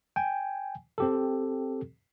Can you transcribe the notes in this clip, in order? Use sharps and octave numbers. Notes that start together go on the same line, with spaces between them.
G5 G#5
C4 G4 A4